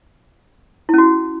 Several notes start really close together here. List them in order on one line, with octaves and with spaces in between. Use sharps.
E4 C#4 F#4